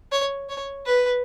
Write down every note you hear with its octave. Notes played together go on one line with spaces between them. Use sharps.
C#5
C#5
B4